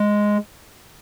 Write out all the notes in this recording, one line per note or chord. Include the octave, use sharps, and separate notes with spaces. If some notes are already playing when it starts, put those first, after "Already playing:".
Already playing: G#3